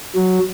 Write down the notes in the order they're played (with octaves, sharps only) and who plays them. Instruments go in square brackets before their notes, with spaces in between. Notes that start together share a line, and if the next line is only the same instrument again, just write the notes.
[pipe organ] F#3